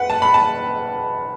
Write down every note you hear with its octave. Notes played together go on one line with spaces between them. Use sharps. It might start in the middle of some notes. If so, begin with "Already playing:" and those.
Already playing: B4 F#5
A5
B5
A5